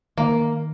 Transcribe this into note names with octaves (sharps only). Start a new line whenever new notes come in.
D#3 A#3